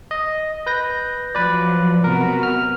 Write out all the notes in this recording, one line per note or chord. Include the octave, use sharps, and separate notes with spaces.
D#5
B4 G6 A#6
F3 F#3 B4 D5
C3 B3 F#4 A#4
F6